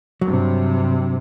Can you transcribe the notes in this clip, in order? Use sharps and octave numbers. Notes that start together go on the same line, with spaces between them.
G2 C3 F#3